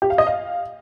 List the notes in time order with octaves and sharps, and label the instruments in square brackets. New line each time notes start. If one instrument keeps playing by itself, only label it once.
[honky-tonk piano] G4
F5
D#5
F5